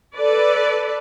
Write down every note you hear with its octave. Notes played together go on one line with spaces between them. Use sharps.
A4 B4 D5